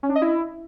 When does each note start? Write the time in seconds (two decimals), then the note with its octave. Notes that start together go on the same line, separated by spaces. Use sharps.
0.03 C#4
0.09 D4
0.15 D#5
0.22 E4